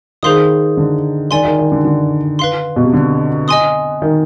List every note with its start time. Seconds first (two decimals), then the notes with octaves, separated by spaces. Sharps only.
0.23 D#3 G#4 C5 F5 C6 D#6
0.77 D3
1.31 D#3 D5 G#5 C6
1.45 D#3
1.59 D#3
1.72 D3
1.85 D3
2.39 B4 F5 C6
2.76 B2
2.84 C3
2.93 D3
3.48 D#5 G#5 C6 D#6
4.02 D#3